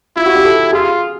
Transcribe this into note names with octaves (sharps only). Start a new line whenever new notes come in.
E4 F4
F#4
G4
A4
F4 G#4